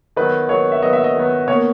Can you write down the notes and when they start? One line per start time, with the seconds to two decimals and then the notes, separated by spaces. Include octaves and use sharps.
0.16 D#3 F#3 B3 B4
0.49 D#3 F#3 B3 C#5
0.72 E5
0.82 D#3 F#3 B3 D#5
0.93 E5
1.04 D#5
1.16 D#3 F#3 B3
1.48 B2 A#3 C#5